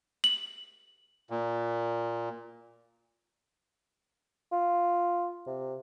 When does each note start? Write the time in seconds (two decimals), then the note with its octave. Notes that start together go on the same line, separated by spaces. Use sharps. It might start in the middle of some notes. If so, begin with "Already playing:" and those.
0.24 F#7
1.30 A#2
4.52 F4
5.47 C3